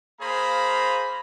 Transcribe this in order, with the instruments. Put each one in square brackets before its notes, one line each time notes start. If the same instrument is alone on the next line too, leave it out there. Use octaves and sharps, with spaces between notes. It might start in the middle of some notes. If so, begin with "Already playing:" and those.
[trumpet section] A#3 G#4 C5 F5 A#5 B5